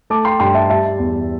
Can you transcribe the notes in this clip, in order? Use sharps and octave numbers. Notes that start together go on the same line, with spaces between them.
A3 A5 D6
G5 C6
G2 G5 C6
E5 A5
G3 E5 A5
E2